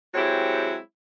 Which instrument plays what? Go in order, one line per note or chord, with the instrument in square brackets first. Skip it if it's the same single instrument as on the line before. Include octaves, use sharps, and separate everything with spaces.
[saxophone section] F#3 G#3 C4 E4 G4 C#5